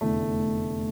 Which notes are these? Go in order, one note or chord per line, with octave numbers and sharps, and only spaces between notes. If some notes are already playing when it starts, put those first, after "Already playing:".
F1 E2 D3 A3